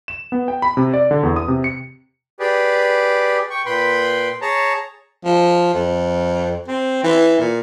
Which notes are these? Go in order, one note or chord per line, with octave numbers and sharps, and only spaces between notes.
E7
B3
G5
B5
C3
D5
D3
E2
D#6
C3
C#7
G4 G#4 B4 D5
G5 C#6
A#2 B4 G5 B5 C6
G#4 C#5 A5 A#5
F3
F2
C4
E3
A#2